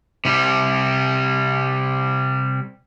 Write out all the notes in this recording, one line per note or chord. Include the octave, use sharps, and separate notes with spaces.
C3 G3